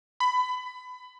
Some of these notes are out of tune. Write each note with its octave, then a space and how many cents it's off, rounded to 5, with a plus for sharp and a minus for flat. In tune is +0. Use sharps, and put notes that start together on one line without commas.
B5 +20